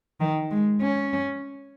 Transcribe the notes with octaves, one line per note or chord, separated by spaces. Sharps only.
D#3
G#3
C#4